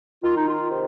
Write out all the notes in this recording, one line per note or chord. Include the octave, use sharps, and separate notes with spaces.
D#3 F4
D#4
F4
C3